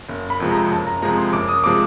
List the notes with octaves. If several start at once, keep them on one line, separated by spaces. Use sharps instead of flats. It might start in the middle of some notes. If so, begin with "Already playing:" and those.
F#1
B5
F2 C3 F3 G#3
A#5
F#1 A5
A#5
F2 C3 F3 G#3 A#5
C6
F#1 D6
D#6
C3 F3 G#3 D6